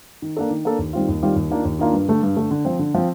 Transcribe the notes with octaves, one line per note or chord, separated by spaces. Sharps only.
D#3
A#3 D4 A4
D#3
A#3 D4 A4
D#2
D#3 G3 C4 F4
D#2
D#3 G3 C4 F4
D#2
D#3 A#3 D4 F4
D#2
D#3 A#3 D4 F4
G2
D3 A3
G2
D3 A3
D3
F3 C4
D3
F3 C4